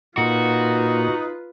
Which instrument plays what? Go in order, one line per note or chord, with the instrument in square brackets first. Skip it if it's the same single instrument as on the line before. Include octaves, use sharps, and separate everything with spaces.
[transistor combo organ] A#2 [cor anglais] D#4 [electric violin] F4 B4 [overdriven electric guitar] F#4